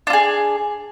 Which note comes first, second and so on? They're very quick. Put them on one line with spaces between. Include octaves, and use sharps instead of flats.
D4 F4 G#4